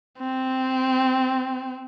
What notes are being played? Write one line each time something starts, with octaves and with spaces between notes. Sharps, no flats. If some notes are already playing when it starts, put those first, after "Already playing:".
C4